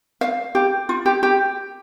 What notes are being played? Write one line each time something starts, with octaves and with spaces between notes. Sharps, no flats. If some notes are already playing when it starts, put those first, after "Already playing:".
F5
G4
F4
G4
G4